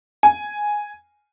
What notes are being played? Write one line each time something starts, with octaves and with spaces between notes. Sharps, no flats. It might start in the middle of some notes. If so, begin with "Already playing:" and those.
G#5